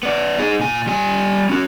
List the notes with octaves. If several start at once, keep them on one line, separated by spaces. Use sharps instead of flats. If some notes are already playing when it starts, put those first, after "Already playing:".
B3 D5
D#4 G#4
A#2 G#5
G3 G#5
C#4 F#4